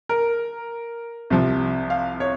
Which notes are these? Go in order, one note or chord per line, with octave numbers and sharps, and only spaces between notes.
A#4
C2 C3 F3
F5
C#5